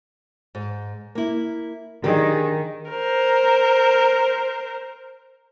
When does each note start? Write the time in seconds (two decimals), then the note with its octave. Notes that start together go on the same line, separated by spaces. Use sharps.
0.55 G#2
1.15 A#3 E4
2.04 D#3 D4 G4 G#4 A#4
2.90 A#4 C5